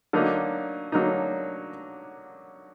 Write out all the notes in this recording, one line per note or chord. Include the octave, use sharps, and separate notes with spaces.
D3 F#3 A#3 D#4
D3 F#3 A#3 D#4